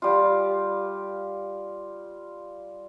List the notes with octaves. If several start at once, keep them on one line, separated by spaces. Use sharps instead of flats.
G3 F4